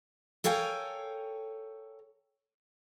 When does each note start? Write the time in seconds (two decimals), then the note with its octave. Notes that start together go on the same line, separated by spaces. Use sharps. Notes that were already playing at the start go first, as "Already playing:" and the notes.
0.44 A4 A#4 C#5 F5 G5 G#5